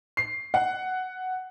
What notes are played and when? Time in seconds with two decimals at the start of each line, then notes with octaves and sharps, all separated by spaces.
0.17 C7
0.54 F#5